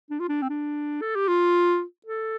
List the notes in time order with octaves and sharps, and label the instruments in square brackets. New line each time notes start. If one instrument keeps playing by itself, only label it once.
[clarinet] D4
F4
D4
C4
D4
A4
G4
F4
A4